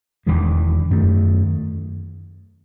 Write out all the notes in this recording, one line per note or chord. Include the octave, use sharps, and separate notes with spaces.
E1 E2 D#3 G#3
F#2 D#3 A3